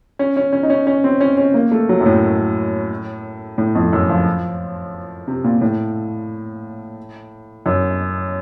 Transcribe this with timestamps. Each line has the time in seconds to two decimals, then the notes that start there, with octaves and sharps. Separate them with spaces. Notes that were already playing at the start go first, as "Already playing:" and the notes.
0.19 C#4
0.37 C#4
0.53 C#4
0.63 D#4
0.70 C#4
0.87 C#4
1.04 C4
1.20 C#4
1.37 C#4
1.54 A#3
1.72 A3
1.89 F#3
2.01 F#2
2.06 A2
3.58 A2
3.75 F2
3.93 F#2
4.09 F3
5.28 C3
5.44 A#2
5.61 A2
7.66 F#2